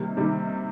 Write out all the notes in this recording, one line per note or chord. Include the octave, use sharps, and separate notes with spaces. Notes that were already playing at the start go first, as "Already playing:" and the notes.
Already playing: C3 D#3 G3 A#3
C3 D#3 G3 A#3